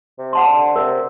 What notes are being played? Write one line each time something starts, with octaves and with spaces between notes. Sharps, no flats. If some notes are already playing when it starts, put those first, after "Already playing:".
C3
F#5 A5 C6
D3
C3 A#4